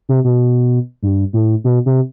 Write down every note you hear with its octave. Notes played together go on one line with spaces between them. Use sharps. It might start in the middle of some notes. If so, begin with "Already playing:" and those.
C3
B2
G2
A2
B2
C3